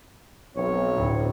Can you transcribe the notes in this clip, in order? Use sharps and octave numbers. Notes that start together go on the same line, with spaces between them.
B1 C4 C#5
D2 A2